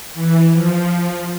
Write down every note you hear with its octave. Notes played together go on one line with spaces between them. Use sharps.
E3
F3